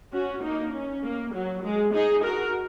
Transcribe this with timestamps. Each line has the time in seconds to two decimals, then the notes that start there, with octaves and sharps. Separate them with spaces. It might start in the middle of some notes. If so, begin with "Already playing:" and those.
0.12 C#4 F#4
0.43 A#3 D#4
0.73 C#4
1.03 A#3
1.33 F#3
1.63 G#3
1.93 D#4 G#4
2.23 F#4 A#4